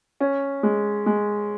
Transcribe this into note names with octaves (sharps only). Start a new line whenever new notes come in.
C#4
G#3
G#3